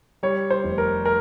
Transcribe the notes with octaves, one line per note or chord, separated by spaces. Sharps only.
G3 C#5
C5
F1
A#4
A#4